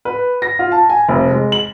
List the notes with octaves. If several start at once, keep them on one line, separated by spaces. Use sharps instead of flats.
B4
A#6
F4
A5
G#5
F1
G#3
F#7